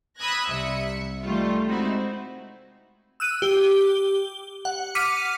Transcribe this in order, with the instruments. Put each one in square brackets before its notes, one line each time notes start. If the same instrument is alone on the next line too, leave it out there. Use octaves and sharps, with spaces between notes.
[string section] B5 D#6 E6 F#6 G#6 A#6
C2 E5 C#7
D#3 G3 A3 F4
G#3 C4 D#4 E4 F#4
[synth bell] E6 F#6 D#7
G4 G7
F#5
D6 F6 B6 C#7 D#7